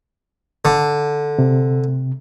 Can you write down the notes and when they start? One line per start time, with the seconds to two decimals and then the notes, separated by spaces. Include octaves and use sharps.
0.65 D3
1.39 C3